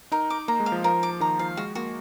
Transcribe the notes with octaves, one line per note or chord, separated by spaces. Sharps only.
D#4 A#4
D6
A#3 A#5
G#3
F5
F3
F3 A#4
D6
D#3 A#5
F3 F5
G#3 F#4
A#3 F#4